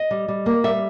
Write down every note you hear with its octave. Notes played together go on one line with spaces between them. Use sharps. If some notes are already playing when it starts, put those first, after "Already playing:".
Already playing: D#5
G3
G3
A#3
G3 E5